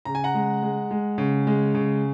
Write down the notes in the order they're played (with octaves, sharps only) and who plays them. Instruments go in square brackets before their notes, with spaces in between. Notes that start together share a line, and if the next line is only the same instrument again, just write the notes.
[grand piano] C#3 A#5
G#5
F#5 A#5
G#3
G#3
G#3
C#3
G#3
C#3